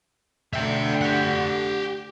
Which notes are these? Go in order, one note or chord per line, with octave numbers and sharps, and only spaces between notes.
D2 D3 E5 G5
G4 F#5